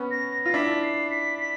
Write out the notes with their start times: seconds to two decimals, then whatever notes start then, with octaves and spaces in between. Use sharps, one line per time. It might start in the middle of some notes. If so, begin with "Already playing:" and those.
Already playing: B3 C#4
0.11 A#6
0.46 F4
0.54 D4 E4 B6
0.83 C7
1.10 B6
1.39 B6